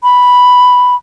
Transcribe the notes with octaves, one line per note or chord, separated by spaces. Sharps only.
B5